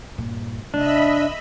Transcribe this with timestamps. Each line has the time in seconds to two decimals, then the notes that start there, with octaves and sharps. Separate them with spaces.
0.18 G2 A#2
0.74 F1 D4 D#5 E5 B5